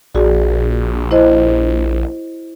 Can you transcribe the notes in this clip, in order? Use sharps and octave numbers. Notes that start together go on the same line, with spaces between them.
A#1 F#4 G#4 D5
E4 C5 D#5